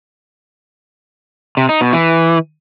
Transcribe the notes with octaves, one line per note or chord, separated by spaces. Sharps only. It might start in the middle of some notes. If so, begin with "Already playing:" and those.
C3
D#4
B2
E3